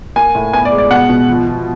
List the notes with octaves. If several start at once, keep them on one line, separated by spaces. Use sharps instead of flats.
A#3 G#5
A2
B3 G#5
D5
G#3
D5
B2 F#5
B2
F3
F3